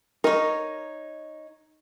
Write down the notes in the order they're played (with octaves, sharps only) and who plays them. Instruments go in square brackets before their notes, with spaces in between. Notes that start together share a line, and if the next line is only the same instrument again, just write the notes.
[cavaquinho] D#4 C#5 [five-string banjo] A#4